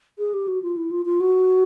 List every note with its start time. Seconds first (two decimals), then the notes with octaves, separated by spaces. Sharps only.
0.19 G#4
0.34 G4
0.48 F#4
0.62 F4
0.77 E4
0.91 F4
1.06 F4
1.20 F#4